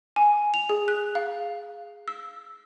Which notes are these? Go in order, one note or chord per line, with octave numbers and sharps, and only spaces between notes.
G#5
F7
G#4
F#6
F5
E6